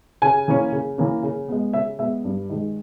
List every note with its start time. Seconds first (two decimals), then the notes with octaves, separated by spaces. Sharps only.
0.22 C#3 G#5
0.48 E3 A#3 C#4
0.72 C#3
0.98 E3 A#3 C#4
1.23 C#3
1.48 G#3 B3
1.73 C#3 E5
1.99 G#3 B3 E5
2.25 G2
2.49 D#3 G#3